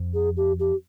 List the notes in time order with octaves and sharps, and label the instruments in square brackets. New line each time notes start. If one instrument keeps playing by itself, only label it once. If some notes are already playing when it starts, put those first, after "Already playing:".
Already playing: [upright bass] F2
[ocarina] G#4
G4
G4